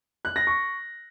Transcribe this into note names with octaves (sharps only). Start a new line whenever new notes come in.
F#6
A#6
C#6